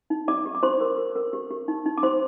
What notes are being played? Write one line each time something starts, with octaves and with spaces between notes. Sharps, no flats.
D#4
G4 D5 D6
G4
D6
G4 C5 C6
A#4
A#4
A#4
G4
G4
D#4
D#4
D6
G4 C5 C6